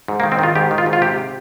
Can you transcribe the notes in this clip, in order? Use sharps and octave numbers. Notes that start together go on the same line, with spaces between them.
G#2
A#3
D#3
C4
D#3 F4
G#2 G4
D#3
F4
G#2
F4
C3 G4